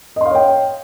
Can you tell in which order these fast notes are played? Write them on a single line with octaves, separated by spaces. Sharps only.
D#5 C6 F5 C#5 G5